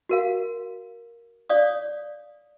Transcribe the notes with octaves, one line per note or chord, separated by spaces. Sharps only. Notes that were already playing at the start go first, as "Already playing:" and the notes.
F#4 A#4 F5
C#5 D5 F5 D#6